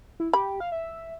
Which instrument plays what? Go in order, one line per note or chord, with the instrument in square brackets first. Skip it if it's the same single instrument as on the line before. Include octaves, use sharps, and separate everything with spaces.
[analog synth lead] E4
[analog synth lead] G4 [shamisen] B5
[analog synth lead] F5
E5